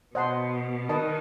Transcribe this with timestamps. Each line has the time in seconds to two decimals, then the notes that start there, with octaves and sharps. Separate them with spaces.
0.15 B2 C5 D#5 F#5 A5 C6
0.89 D#3 B4 D#5 A5